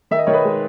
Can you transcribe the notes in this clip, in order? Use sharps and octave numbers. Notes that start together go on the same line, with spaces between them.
D#3 E5
D#5
D#3 C#5
B4 D#5
G#3